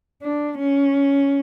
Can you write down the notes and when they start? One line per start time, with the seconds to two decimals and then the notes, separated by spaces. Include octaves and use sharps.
0.22 D4
0.59 C#4